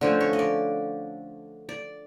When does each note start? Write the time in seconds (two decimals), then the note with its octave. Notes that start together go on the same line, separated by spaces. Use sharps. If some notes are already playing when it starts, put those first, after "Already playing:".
0.01 D3 F3 A3 C#4 C5
0.21 C#5
0.33 D#5
0.39 D5
1.69 D5